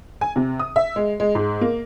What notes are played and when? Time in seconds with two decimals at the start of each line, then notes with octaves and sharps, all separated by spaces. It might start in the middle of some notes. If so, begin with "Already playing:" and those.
0.21 G#5
0.36 C3
0.60 D#6
0.76 E5
0.96 G#3
1.20 G#3
1.35 G#2
1.61 A#3